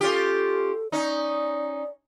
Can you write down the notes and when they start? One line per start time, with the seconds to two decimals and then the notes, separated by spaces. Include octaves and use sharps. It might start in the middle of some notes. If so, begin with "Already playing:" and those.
0.01 C#4 F4 G4 A4
0.92 C#4 D#4 D5